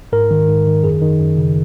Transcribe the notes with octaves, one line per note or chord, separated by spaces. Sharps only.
G#2 A#4
D#3
G#2
D#3
F#2 G#4
D#3
F#2
C#3